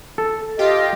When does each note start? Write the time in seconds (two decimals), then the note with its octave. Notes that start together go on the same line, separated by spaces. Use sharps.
0.18 A4
0.59 F4 G4 D#5